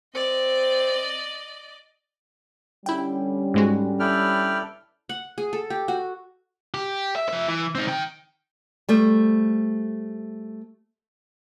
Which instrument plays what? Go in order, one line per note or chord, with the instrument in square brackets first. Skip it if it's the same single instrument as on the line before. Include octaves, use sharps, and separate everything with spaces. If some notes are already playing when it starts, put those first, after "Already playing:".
[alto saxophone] C4 [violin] D5 D#5
[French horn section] D3 G3 C#4 [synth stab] E4 G5
[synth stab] G#2 G#3 F#4
[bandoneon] E4 A4 D5 [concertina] B4 G5 F6
[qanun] F#5
G#4
A4
G4
F#4
[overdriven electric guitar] G4
E5
F3 E5
E3
C4 D#4
D#3 G5
[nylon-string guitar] G3 A3 C5